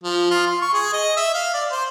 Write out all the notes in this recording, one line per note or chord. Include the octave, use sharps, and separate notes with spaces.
F3
F4
C6
C#6
G#4
D#5
E5
F5
D5
C5